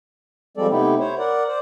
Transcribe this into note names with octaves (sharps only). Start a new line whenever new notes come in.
F3 G3 G#3 C4 A4 D5
C3 A3 B3 D#4 E4 G4
E4 C5 C#5
A#4 D5 F#5
C5 D5